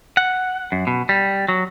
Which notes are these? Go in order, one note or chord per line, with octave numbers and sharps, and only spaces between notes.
F#5
F#2
B2
G3
F#3